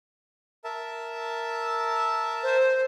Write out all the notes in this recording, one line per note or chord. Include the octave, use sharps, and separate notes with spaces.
A#4 E5 A5
C5